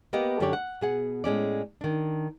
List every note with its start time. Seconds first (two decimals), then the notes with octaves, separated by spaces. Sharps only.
0.13 A#3 B3 G4 B4 D#5 F#5
0.40 F#2 D3 D4 G4 C#5 D5
0.53 F#5
0.81 B2 G#4 F#5
1.24 A2 G#3 C#4 D5
1.81 D#3 D4